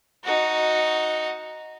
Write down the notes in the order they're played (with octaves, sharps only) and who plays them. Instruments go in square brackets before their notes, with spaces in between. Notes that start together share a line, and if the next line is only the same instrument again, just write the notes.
[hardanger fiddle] D#4 F#4